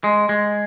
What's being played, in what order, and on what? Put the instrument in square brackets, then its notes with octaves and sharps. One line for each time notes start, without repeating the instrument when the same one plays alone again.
[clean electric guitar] G#3
G#3